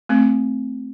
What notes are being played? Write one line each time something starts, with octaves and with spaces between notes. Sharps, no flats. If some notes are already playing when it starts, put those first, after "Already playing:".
A3 C4